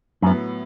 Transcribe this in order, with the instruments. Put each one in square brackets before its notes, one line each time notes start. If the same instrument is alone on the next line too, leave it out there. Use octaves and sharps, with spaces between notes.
[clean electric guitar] F#2 [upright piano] A2 F#3 B3